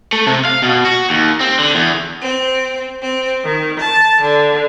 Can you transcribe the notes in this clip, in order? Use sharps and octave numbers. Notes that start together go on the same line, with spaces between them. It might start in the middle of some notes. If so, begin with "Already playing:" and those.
A3
C3
F5
B2
F#4
D#2
C4
D3
E2
C4
C4
D#3
A5
D3